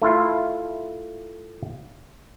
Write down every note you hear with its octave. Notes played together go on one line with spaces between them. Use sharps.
A3 E4 F4 F5